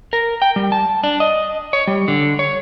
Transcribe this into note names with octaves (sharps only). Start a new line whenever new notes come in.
A#4
G5
G3
A5
D4
D#5
C#5
G3
D3
C#5